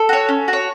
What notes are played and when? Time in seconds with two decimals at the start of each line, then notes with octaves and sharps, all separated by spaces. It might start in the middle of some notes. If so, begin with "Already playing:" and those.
Already playing: A4
0.09 F#4 C#5
0.29 C#4
0.48 F#4
0.53 C#5